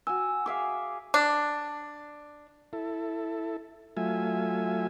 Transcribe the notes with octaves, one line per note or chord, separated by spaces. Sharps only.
F#4 G#5 E6
G#4 E5 F5 D6
D4
E4 A4
F#3 A3 F4 E5 G#5